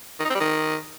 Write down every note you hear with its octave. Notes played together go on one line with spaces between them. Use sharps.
D#3
D#4
C4
G3
D#3